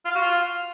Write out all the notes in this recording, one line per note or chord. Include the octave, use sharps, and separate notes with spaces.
F4
F5
F#4
F4